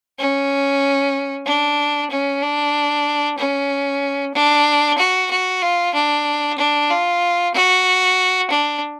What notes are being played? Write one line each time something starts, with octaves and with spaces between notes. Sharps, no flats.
C#4
D4
C#4
D4
C#4
D4
F#4
F#4
F4
D4
D4
F4
F#4
D4